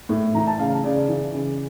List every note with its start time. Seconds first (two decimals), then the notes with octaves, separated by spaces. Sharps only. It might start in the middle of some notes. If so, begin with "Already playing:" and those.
0.09 A2
0.35 E3 A#5
0.47 A5
0.59 C#3 F5
0.84 C#3 D5
1.09 E3
1.34 C#3